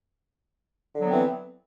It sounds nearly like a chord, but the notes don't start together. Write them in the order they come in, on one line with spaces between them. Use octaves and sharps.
D3 F#3 B3 C4 E3